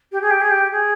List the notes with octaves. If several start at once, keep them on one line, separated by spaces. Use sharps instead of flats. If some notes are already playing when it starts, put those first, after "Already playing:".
G4
G#4
G4
G#4
G4
G#4